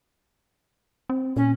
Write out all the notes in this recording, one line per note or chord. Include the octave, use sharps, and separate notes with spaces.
C4
A#2 C#4